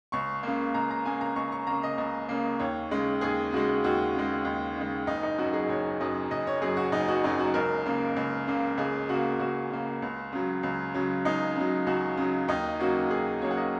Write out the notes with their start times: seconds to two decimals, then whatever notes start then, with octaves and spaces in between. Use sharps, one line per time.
0.12 C#2 C#6
0.43 C#3 A#3
0.74 C#2 A#5
0.91 A#5
1.05 C#3 A#3 G#5
1.21 A#5
1.36 C#2 C#6
1.52 C#6
1.67 C#3 A#3 A#5
1.83 D#5
1.98 C#2
2.29 C#3 A#3
2.59 D#2 C#5
2.91 C#3 G#3
3.21 D#2 G#4
3.52 C#3 G#3 F#4
3.84 D#2 F#4
4.15 C#3 G#3
4.45 D#2
4.77 C#3 G#3
5.07 F#1 D#4
5.23 D#4
5.38 F#2 F#3 F#4
5.53 G#4
5.69 F#1 C#5
6.00 F#2 F#3 D#5
6.31 F#1 D#5
6.47 C#5
6.61 F#2 F#3 G#4
6.77 F#4
6.92 F#1 D#4
7.08 F#4
7.24 F#2 F#3 D#4
7.39 F#4
7.54 C#2 A#4
7.86 C#3 A#3
8.16 C#2
8.47 C#3 A#3
8.78 C#2 G#4
9.09 C#3 A#3 F#4
9.40 C#2 F#4
9.71 C#3 A#3
10.02 C#2
10.33 C#3 F#3
10.63 C#2
10.94 C#3 F#3
11.25 C#2 D#4
11.56 C#3 F#3
11.87 C#2 F#4
12.17 C#3 F#3
12.48 D#2 D#4
12.80 C#3 F#3 A#3 F#4
13.10 D#2 G#4
13.42 C#3 F#3 A#3 C#5
13.51 F#5
13.57 D#5